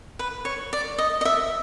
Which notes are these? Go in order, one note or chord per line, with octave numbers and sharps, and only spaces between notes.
B4
C#5
D5
D#5
D#5
E5